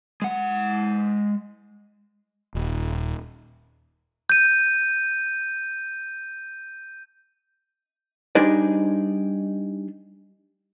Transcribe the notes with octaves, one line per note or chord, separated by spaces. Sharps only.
G#3 F#5
D#1
G6 D#7
G3 D4 D#4 G#4 C5 D5